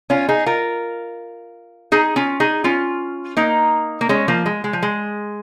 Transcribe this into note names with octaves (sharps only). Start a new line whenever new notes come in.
C#4 F4
D#4 G#4
F4 A#4
D#4 G#4
C#4 F4
D#4 G#4
C#4 F4
A#3 D#4
A#3
G#3 C#4
F3 A#3
G#3
G#3
F3
G#3